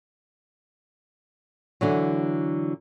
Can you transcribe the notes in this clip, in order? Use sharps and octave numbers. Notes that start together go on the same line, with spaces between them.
D3 E3 F#3